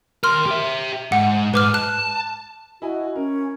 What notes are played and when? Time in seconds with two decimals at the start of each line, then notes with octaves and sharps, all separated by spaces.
0.24 D#2 A#4 C6 F6
0.46 G4 E5
1.12 G#2 F#5
1.54 G#2 B4 D6 F6
1.74 A5 F#6
2.82 E4 F#4 D#5 G#5
3.16 C#4 A#4